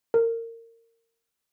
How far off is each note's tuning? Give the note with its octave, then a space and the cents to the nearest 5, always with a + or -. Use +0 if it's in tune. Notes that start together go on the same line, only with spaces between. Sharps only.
A#4 -25